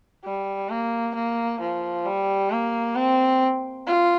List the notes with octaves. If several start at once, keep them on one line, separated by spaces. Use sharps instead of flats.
G3
A#3
A#3
F3
G3
A#3
C4
F4